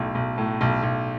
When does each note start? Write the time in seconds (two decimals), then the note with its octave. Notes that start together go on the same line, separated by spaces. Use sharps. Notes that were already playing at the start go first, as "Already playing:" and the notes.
Already playing: B1 A2
0.15 B1
0.38 A2
0.61 B1
0.83 B1